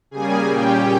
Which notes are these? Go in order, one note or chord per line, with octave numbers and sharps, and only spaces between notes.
C#3 G3 A#3 G#4 G#5
A#2 G3 C#4 G4 G5